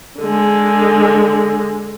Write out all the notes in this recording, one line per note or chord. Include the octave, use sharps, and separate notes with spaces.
D3 G#3